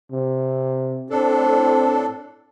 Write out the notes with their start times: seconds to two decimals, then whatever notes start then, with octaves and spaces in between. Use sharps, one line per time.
0.11 C3
1.10 A2 C4 D4 A4